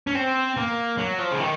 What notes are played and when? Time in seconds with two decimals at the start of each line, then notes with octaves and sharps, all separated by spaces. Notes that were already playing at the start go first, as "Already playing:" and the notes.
0.07 C#4
0.15 C4
0.57 A#3
0.98 F#3
1.19 F3
1.32 C#3
1.40 D#3